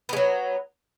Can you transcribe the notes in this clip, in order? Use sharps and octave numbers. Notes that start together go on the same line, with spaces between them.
F#3 G#3 B3